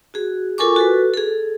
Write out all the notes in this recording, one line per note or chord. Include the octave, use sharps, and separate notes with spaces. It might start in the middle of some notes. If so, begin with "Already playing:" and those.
F#4 G#4
F4 A4 A#4 G#5 C#6 D6
F#4 A4 B4
G#4 A4